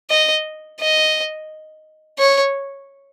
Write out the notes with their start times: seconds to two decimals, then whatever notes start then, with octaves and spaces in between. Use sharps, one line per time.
0.10 D#5
0.80 D#5
2.19 C#5